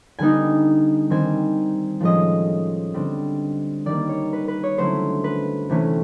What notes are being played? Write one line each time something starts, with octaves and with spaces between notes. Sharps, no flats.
D3 G3 B3 D#4 G#5
D#3 G3 C4 G#5
A2 F3 G#3 C#4 D#5
D3 G3 C4
D#3 G3 A#3 D5
C#5
B4
B4
C#5
D3 F#3 A3 C#4 E4 C5
B4
C3 E3 A3 C#4